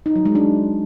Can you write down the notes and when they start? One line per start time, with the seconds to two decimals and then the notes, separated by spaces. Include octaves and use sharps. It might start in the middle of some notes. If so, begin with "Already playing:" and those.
0.06 D#4
0.16 F#3
0.25 G#3
0.35 D4